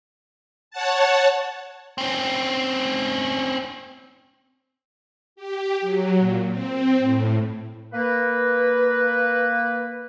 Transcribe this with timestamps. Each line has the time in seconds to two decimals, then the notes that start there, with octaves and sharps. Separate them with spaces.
0.71 C#5 F#5 A5
1.98 C4 C#4
5.36 G4
5.81 F#3
6.19 A#2
6.48 C4
6.99 A2
7.94 A#3 B4